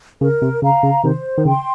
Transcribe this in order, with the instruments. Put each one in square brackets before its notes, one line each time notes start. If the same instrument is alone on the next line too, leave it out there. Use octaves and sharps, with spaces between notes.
[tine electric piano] C#3 [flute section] A#4
[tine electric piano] C3
[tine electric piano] C#3 [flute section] F5 A#5
[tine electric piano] C#3
[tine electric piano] C3 D#3 [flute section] C5
[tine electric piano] D#3
[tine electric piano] C#3 [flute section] G5 C6